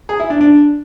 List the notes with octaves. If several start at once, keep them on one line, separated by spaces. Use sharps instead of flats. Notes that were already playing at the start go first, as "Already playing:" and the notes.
G#4
E4
D4
D4